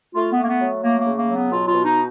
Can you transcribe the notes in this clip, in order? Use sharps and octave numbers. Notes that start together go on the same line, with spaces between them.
A3 F4
B3
A3
A#3
B3
F#3
A3 A#3
A#3
C#3
A#3
F#3
B3
B2 F4
F4
B2
D#4